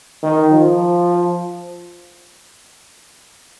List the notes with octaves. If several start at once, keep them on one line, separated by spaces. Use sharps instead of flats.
D#3
F3